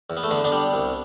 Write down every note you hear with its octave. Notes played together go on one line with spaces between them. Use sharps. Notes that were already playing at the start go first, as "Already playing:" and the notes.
E2
B3
A3
D3 B3
B3 D4
G3
C2